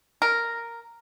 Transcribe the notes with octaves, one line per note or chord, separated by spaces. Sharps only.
A#4